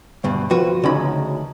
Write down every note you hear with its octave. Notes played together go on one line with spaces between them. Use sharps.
D2 G2 B2
F3 F#4 B4
D2 C#3 C#4 D#4 B5